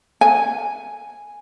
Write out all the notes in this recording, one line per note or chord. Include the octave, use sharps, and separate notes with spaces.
G#5